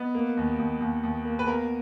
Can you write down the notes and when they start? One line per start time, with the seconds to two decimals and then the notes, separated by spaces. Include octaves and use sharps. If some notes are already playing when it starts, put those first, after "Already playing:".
Already playing: B3 D#5
0.15 A#3
0.37 D#2
0.58 D#2
0.81 D#2
1.04 D#2
1.25 A#3
1.39 B4
1.47 B3 A#4